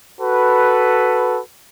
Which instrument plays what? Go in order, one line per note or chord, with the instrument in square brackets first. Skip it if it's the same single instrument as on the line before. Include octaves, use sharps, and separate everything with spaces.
[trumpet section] F#4 A4 B4